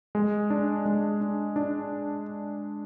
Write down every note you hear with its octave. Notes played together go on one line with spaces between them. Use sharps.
G#3
D4
G#3
D4
D4